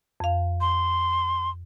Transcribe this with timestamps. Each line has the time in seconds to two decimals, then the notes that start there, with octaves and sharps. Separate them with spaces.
0.20 F2 F5
0.61 C6